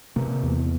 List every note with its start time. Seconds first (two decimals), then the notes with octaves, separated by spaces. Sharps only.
0.16 C3 A#3
0.43 E2